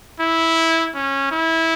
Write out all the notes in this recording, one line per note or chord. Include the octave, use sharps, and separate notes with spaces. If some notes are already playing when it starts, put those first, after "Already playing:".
E4
C#4
E4